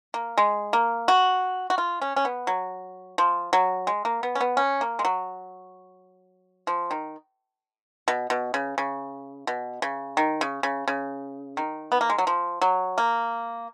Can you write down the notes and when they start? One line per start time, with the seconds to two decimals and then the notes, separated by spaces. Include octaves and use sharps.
0.14 A#3
0.38 G#3
0.73 A#3
1.08 F#4
1.70 F#4
1.78 F4
2.01 C#4
2.16 C#4
2.25 B3
2.47 F#3
3.18 F3
3.53 F#3
3.87 G#3
4.05 A#3
4.23 B3
4.35 C#4
4.41 B3
4.57 C#4
4.81 A#3
4.99 G#3
5.05 F#3
6.67 F3
6.91 D#3
8.08 B2
8.30 B2
8.54 C#3
8.78 C#3
9.47 B2
9.82 C#3
10.17 D#3
10.41 C#3
10.63 C#3
10.88 C#3
11.57 D#3
11.92 B3
12.01 A#3
12.10 G#3
12.18 F#3
12.27 F3
12.61 F#3
12.98 A#3